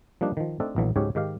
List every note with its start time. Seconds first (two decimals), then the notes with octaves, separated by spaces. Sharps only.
0.21 F3 G3 A#3 D4 D#4
0.37 D#3 F3
0.60 A3 C4 D4 D#4 A4
0.76 A#1 B2 E3 F#3 A3
0.96 C#2 G#2 F#3 C#4 G4 C#5
1.15 G#2 D#3 G4 F5